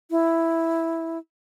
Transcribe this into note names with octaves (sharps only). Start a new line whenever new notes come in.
E4